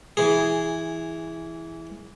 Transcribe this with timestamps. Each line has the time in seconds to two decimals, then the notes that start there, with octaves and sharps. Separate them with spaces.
0.17 E3 G#4